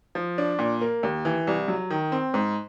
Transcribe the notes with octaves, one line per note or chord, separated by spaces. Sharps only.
F3
D4
A#2
A#3
D#2
E3
C2
F#3
D#3
C4
G#2